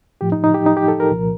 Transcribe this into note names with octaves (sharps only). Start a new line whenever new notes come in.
A2 F3 G4
D#4
D#4
G4
D#4
G4
A4
A#4
C2 A#2 F3